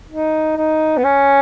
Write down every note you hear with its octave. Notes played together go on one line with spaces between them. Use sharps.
D#4
D#4
B3
C#4